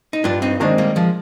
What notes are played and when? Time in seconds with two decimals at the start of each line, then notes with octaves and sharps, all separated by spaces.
0.13 D#4
0.24 G2 D4 F4
0.42 C4 D#4
0.60 D#3 G#3 A#3 C4 D4
0.78 G3 A#3
0.96 F3 G#3